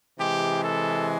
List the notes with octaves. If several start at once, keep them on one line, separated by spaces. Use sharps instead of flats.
C3 E3 G#3 G4
A4